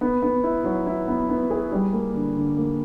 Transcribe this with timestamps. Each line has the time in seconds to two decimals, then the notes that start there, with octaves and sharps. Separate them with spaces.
0.01 B3
0.22 B3
0.43 E4
0.64 F#3
0.86 E4
1.08 B3
1.29 B3
1.50 G#4
1.72 G3
1.93 A#3
2.15 D3
2.36 D3
2.57 A#3